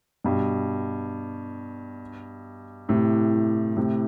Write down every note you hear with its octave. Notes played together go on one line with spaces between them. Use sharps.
G2 B2
A2 C3
A2 C3